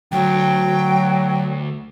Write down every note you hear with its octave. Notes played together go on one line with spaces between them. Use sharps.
D2 F#3 G5